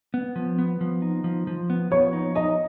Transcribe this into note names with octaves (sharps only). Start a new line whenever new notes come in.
B3
F3
B3
F3
D#4
F3
F3
B3
F3 C#5
D#4
D#4 D#5